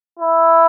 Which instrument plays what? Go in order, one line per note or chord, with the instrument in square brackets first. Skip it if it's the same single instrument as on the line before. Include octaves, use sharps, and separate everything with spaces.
[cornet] E4